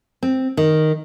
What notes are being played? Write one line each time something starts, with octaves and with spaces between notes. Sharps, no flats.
C4
D#3